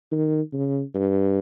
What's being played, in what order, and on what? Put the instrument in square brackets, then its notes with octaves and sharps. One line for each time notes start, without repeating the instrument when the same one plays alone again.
[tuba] D#3
C#3
G2